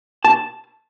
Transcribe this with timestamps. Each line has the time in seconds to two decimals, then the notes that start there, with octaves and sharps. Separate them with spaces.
0.24 A5